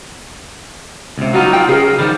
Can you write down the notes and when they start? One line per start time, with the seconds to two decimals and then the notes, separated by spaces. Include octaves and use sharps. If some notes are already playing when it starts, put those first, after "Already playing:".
1.18 C#2 C3
1.33 F#3 G3 C#4 D#4 F4 F#4
1.53 F4 G5
1.69 C#3 G#4 A#4
1.99 D#3 F3 G3